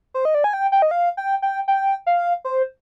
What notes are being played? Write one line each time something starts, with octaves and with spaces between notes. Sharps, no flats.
C5
D#5
D5
G#5
G5
G5
D#5
F5
G5
G5
G5
F5
C5